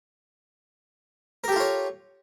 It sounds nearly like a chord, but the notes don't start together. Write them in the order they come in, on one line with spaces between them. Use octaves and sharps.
A#4 G4 A4 F4 C#5